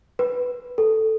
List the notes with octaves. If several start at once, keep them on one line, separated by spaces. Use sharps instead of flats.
B4
A4